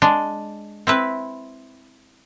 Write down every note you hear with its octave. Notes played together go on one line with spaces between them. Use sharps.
G#3 D4
C4 E4 B4